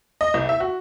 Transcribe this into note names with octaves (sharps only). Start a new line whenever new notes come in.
D#5
C2
E5
F#4